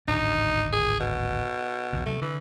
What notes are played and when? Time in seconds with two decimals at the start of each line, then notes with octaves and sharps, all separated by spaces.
0.08 D1 G#1 D4 D#4
0.73 G#4
1.00 B2
1.93 B1 E2 G#2
2.06 C3 F#3 A3
2.21 D3 E3